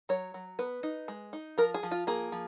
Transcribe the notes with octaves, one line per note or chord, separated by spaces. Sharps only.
F#3 C#5
F#3
B3 B4
D#4
G#3
D#4
F3 A#4
G#4
F3
F4
A#3 G#4
F3